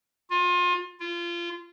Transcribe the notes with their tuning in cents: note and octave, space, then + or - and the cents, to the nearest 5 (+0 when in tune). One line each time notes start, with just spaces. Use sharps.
F4 +30
F4 -25